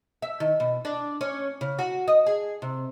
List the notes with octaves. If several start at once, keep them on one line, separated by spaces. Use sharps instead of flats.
E5
D#3
B2
D4
C#4
C#3
F#4
D#5
G#4
C3